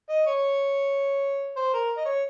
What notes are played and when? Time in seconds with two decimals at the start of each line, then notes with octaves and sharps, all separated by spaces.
0.09 D#5
0.27 C#5
1.57 C5
1.74 A#4
1.97 D#5
2.06 C#5